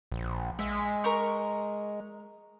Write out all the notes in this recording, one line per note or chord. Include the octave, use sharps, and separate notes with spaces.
A#1
G#3 E5
A#4 A#5 C#6